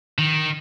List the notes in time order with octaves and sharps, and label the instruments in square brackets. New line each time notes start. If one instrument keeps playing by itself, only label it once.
[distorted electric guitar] D#3